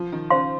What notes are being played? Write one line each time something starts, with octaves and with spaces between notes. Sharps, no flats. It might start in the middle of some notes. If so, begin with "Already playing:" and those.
Already playing: F3
D#3
C#3 C5 F5 C6